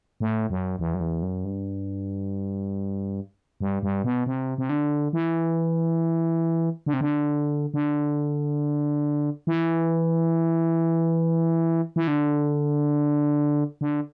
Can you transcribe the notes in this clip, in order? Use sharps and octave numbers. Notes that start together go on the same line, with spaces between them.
A2
F#2
E2
F#2
E2
F#2
G2
G2
G2
B2
C3
C3
D3
E3
D3
C3
D3
D3
E3
E3
D3
D3